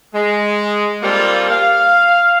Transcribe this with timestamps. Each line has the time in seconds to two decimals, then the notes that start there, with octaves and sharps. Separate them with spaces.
0.14 G#3
1.03 G3 A#3 C4 F4 A4
1.50 F5